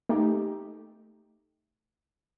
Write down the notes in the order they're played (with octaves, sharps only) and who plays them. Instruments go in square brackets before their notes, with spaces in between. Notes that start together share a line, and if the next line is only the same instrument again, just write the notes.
[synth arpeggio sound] A3 D#4 G4